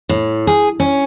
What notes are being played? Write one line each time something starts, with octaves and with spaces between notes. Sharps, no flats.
A2
G#4
C#4